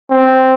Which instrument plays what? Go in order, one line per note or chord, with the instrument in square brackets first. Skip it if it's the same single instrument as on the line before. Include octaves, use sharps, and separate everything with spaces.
[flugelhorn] C4